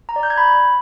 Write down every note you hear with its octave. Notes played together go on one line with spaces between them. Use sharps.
A#5
D5
G6
G#6
B5